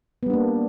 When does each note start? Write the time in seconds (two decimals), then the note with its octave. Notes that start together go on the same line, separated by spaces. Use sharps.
0.23 B3
0.26 G3
0.30 D4
0.34 A#3